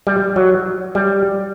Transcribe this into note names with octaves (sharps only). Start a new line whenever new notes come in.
G3
F#3
G3